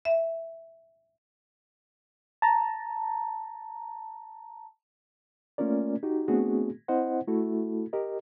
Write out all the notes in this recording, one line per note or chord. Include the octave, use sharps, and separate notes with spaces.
E5
A5 A#5
A3 A#3 C#4 F4 A#4 D5
D#4 F#4 G4
A3 B3 C4 D4 F#4 G#4
C4 E4 C5 D#5 F#5
A3 E4 F#4 A4
G4 A#4 D#5